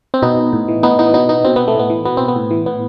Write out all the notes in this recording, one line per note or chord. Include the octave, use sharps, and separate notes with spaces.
C4
B2 B3 D#4
A2
E3
A2 B3 D#4
E3 B3 D#4
B2 B3 D#4
B3 D#4
B2 C4
B3
A3
A2 B3
E3
B2 B3
C4
B3
A2
E3
A2 B3